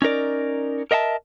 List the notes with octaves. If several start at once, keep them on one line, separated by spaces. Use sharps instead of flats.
C#4 D#4 A#4 D5
A#4 D#5 E5 F#5 A5